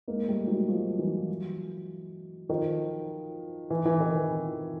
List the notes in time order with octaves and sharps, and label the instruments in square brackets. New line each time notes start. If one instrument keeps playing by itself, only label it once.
[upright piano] G#3 A#3
G3 A3
F#3 G#3
F3 G3
E3 F#3
D#3 F3
E3
E3
D#3
E3